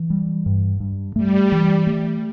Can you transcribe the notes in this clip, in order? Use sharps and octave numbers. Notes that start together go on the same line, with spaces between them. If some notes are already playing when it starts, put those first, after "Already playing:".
Already playing: E3
G3
G2
G2
G3 A3
E3
A3